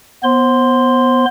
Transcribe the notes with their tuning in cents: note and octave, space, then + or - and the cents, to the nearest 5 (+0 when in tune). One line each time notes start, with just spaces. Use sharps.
B3 +0 C5 +25 C6 -5